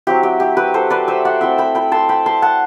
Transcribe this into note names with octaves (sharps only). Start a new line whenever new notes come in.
F#3 C4 E4 G4
G4
G4
G4 B4
A4 C5
B4 D5
C5 E5
D5 F#5
A3 C4 E4 E5 G5
G5 B5
G5 B5
A5 C6
G5 B5
A5 C6
F#5 A5